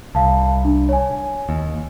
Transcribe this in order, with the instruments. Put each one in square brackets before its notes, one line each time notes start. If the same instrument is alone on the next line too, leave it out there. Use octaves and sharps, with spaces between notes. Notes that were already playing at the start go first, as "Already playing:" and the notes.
[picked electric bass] C2 [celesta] F5 A5
[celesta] D4
C#5 G#5
[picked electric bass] D#2